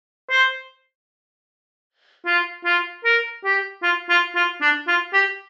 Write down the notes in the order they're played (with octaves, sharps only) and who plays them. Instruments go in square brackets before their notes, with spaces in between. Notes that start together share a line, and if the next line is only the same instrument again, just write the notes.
[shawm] C5
F4
F4
A#4
G4
F4
F4
F4
D4
F4
G4